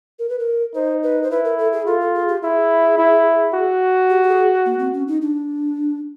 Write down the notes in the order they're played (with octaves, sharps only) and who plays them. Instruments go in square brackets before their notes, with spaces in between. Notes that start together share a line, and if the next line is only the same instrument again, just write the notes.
[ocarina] A#4
B4
A#4
[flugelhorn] D#4 [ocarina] C5
[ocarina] B4
C5
[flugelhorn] E4 [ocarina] B4
[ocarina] A#4
A4
G#4
[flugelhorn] F4 [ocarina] A4
[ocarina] A4
G#4
G4
[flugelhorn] E4 [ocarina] G#4
[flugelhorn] E4
F#4
[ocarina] G4
G4
G#4
A#3
C4
C#4
D#4
D4